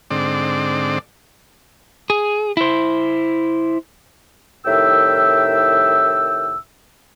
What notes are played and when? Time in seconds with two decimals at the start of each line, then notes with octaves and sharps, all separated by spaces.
0.10 G#2 D3 C4 D5
2.10 G#4
2.57 E4 C5
4.65 C2 A2 D#3 E5 G5 E6